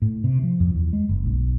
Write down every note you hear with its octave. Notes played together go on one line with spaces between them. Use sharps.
A2
C3
F3
F2
E2
G#3
F#1
B1